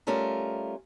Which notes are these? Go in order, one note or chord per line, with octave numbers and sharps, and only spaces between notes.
G3 A3 C#4 F4 A#4